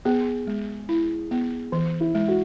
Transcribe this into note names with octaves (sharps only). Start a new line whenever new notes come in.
B3 G#4
G#3
E4
B3
E3
E4
G#3
F#4